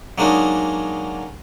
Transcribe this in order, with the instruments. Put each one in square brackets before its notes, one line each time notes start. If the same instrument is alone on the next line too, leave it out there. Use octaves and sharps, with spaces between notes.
[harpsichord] F#3 G#3 A#3 D4 D#4